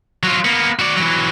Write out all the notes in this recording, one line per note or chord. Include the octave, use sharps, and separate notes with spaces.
F#3 F4
A#3 B3
F#4 D5
E3 F#3